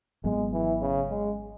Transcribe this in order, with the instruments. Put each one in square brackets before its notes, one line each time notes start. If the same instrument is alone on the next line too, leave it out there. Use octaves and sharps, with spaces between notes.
[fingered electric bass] G#1 G#2 F#3 B3 [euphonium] G#3
[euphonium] E3
C#3
G#3